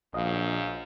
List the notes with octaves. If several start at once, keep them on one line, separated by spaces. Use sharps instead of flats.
A#1 F#2 D#5 F5